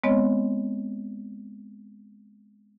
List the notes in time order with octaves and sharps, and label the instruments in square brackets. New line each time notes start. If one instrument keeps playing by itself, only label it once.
[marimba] G#3 B3 C4 C#5 D#5